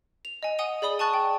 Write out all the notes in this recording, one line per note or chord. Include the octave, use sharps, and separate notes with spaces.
F7
D#5 G#5
F#5 G#5 D#6 D#7 G7
G#4 D5 B5 D#6 G7
G#5 A5 C#6 F#6 A6
G5